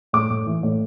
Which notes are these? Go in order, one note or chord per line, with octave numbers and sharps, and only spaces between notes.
A2 D6
A2
E3
A2